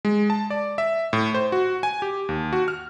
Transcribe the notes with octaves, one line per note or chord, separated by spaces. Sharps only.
G#3
A5
D5
E5
A2
C5
F#4
G#5
G4
D#2
F#4
F6